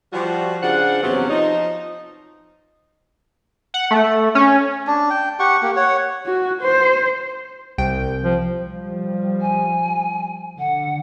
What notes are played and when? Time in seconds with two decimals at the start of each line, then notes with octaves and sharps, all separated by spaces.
0.13 F3 G3 F#4
0.62 C#3 D4 F4 C5 F#5
1.03 E2 C3 F3 F#3 B3 C#4
1.30 F3 D#4
3.74 F#5
3.91 A3
4.35 C#4
4.87 D4
5.10 G5
5.40 G4 F#5 C#6
5.62 A#3 G4
5.76 C#5 F#5
6.26 F#4
6.62 C5
7.78 C2 G5
8.24 F3
8.62 F3 G3
9.41 G#5
10.59 D3 F#5